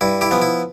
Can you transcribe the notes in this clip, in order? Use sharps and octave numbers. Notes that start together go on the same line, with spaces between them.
G2 E4
E4 G4
F3 B3
E4